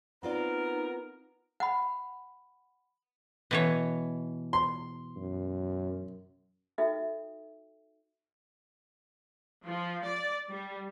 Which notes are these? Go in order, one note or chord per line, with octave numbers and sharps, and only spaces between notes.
B3 C4 D#4 F4 A#4 D5
F#5 B5
B2 E3 C#5
C6
F#2
D#4 F#4 A4 E5 G5
F3
D5
G3